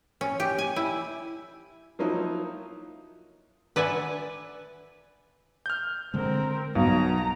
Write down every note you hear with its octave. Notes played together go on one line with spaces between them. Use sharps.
C#4
G4
G#5
E4
F3 F#3 A#3 D#4 E4
B4 D5 E5 F#5 G#5
F6 G6
D3 G#3 C4 A#4
B1 B2 A#5